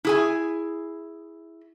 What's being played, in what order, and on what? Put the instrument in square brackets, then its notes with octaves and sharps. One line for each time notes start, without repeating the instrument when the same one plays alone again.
[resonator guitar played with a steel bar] E4 G#4 G#5